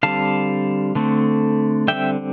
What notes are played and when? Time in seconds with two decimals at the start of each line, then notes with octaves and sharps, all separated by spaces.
0.03 D3 G3 C4 F5 A5
0.95 D3 A3 C4
1.88 D3 G3 C4 E5 G5